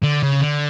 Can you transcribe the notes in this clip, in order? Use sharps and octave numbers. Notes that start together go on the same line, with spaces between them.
D3
C#3
D3